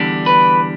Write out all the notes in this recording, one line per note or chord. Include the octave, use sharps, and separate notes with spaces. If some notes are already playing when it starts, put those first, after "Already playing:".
Already playing: E2 D3 G3 D4
B4